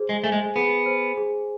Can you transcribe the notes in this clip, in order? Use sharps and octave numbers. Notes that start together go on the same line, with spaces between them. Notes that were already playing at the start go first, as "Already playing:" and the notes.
Already playing: G#4 C5
G#3
A3 G#5
G#3
B3 G#4
C5
G#4